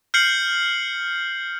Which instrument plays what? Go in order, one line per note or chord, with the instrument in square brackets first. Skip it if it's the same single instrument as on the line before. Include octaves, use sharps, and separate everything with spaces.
[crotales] F6 G6 C7 C#7 F#7